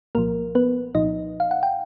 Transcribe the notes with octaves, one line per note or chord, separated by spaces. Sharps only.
C2 A#2 F3 A#3 A#4
B3 B4
C2 A#2 F3 D#4 D#5
F5
F#5
G5